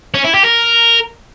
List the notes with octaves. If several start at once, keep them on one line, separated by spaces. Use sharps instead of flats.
C#4
E4
G4
A#4